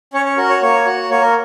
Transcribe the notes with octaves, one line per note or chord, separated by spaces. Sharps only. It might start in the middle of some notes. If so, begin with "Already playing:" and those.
C#4 C#5
C#5
F#4 A#4
C#5
A#3 C#5
F#4
A#3 C#5
A#4